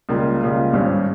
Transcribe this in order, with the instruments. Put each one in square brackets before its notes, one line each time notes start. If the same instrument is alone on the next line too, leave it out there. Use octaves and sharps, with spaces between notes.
[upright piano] C#2 C#3 G3 A#3 F4
C#2 C#3 G3 A#3 F4
G#1 G2 G3 C#4 G4